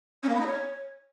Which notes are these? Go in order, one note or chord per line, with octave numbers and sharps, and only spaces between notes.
C#4
A#3
B3
D#4
C#5